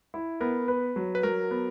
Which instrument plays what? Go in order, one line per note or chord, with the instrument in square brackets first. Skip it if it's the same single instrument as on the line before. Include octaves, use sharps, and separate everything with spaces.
[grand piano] E4
[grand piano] B3 [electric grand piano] A#4
[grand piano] B4
F#3
[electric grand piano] B4
[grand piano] F#3 [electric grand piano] A#4
[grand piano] B3